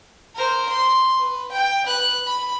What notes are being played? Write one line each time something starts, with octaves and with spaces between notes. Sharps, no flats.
A#4 C5
C6
B4
G5
B4 F#6
B5